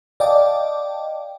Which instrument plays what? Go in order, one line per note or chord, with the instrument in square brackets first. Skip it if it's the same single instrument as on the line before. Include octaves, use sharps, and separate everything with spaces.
[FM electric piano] D5 D#5 F5 G5 A5 D6